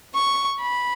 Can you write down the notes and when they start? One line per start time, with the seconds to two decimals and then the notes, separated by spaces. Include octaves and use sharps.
0.15 C#6
0.61 B5